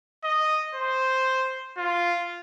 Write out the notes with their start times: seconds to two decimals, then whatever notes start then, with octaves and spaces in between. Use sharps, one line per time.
0.24 D#5
0.75 C5
1.77 F4